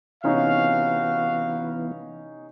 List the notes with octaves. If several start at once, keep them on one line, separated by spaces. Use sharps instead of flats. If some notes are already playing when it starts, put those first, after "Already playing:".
C3 E3 B3 C#4 D#4 F#4 F5